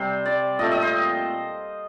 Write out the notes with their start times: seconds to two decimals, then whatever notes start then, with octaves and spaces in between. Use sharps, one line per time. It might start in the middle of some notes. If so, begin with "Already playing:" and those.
Already playing: C3 G3 C4 C5
0.26 D5
0.59 A#2 A3 C4 D#5
0.71 D#5
0.82 C5